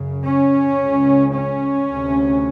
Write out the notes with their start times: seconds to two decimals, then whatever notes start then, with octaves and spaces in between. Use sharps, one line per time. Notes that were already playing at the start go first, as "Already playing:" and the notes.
Already playing: F#2 C#3
0.25 C#4
0.79 C#2 C#3
1.34 C#4
1.88 D2 C3